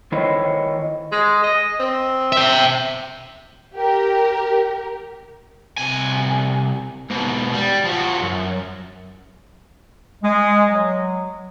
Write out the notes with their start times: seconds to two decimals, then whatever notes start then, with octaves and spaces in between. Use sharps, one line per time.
0.12 D#3 E4 C5 C#5 D#5
1.12 G#3
1.44 D#5
1.80 C4
2.32 E5 G5
3.75 G4 A#4
5.78 C2 G#5
7.10 G#2 B2
7.54 G3
7.86 F3 F#4
8.22 F#2
10.23 G#3
10.69 F#3